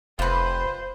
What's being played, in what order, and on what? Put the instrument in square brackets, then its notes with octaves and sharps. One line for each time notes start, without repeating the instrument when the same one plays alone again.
[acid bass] F1 [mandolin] F4 B4 [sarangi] C5